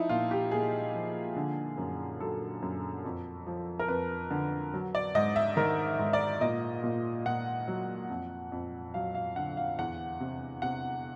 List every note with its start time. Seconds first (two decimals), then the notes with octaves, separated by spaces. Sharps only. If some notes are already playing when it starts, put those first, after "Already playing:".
Already playing: F3 D#4 E4
0.09 A#2 F4
0.31 G4
0.51 A#2 G#4
0.94 F3
1.36 D3
1.78 F#2
2.20 F#3 A4
2.62 F#2
3.05 F2
3.47 F3
3.79 A#4
3.88 F2 B4
4.31 D3
4.74 F#3
4.95 D5
5.15 G#2 D#5
5.36 E5
5.57 D#3 A#4
5.99 G#2
6.13 D5
6.41 A#2 D#5
6.84 A#2
7.26 A#2 F#5
7.68 F#3
8.10 F2
8.52 F2
8.94 F#3 F5
9.15 F5
9.36 D3 F#5
9.57 F5
9.79 E2 F#5
10.20 C3
10.62 C3 F#5